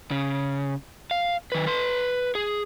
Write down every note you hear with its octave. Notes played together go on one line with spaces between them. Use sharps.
C#3
F5
D#3 B4
B4 C6
G#4